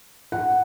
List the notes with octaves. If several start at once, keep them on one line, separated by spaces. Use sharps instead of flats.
F#5